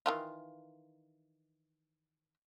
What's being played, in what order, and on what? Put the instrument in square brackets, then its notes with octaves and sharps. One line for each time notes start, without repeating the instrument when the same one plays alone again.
[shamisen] D#3 E3 F4